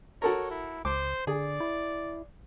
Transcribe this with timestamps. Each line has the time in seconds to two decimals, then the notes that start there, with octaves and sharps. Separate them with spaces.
0.22 F#4 A4 A#4 C#5
0.51 E4
0.85 C#2 C5 D6
1.27 D3 G#4 D5
1.60 E4